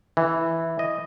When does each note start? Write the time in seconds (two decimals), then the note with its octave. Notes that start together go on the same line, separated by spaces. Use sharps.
0.17 E3
0.79 D#5